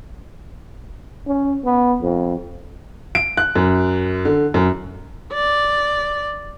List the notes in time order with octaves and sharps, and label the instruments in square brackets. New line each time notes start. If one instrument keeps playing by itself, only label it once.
[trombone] C#4
B3
F2
[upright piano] D7
F#6
F#2
D3
F#2
[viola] D5